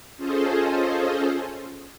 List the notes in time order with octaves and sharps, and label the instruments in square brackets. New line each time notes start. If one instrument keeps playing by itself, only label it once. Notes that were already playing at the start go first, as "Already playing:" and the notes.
[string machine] C#4 F4 G#4 A4 C5 D#5